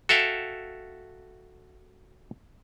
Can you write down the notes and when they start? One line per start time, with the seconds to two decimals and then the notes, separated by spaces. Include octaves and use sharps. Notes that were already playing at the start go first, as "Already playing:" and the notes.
0.09 F#4 A4 E5 F5 G5